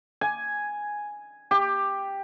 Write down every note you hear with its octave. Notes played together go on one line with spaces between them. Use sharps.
G#5
G4